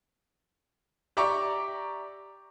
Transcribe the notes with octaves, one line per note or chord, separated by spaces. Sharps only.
G4 D5 E5 A#5 C#6 D6